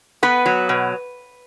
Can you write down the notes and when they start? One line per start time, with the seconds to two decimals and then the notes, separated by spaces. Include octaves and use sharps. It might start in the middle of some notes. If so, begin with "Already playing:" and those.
0.23 B3 B4
0.46 F#3
0.69 B2